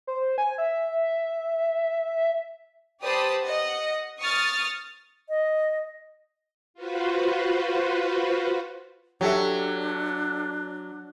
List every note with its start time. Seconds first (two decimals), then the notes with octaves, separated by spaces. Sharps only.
0.07 C5
0.38 G#5
0.58 E5
3.02 G4 B4 C5 D5 A5 D#6
3.44 D#5 F#5
4.20 C#6 D#6 F6 A6
5.29 D#5
6.74 F4 F#4 B4 C5
9.21 F#3 D4 G4 A4 E5